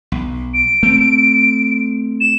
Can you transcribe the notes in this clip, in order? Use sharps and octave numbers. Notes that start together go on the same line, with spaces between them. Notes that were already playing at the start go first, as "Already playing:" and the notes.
B1
D7
A3 C4
E7